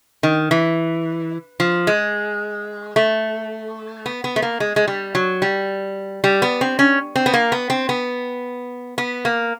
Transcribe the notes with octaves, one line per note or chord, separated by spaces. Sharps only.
D#3
E3
F3
G#3
A3
B3
B3
A3
A#3
G#3
G#3
G3
F#3
G3
G3
B3
C4
C#4
C4
B3
A#3
B3
C4
B3
B3
A#3